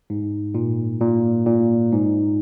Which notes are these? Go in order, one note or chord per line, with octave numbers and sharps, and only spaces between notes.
G#2
A#2
A#2
A#2
G#2